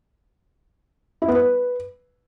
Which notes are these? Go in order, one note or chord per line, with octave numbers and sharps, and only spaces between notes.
E4
B3
B4